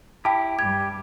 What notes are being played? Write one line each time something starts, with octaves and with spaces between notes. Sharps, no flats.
E4 G4 G5 A5
G2 G3 G4 G#6